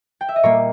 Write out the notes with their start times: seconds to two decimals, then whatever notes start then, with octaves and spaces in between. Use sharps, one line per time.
0.21 G5
0.29 E5
0.36 D#5
0.43 A#2 G3 A#3 A#4 C#5